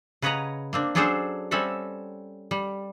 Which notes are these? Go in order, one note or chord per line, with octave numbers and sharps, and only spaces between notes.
C#3 B4 C#5 D#5 F#5 A#5
A#3 C4 D4
F#3 C#4 D4 G#4 A4 C5
G3 C4 C#4 A4 E5 F#5
G3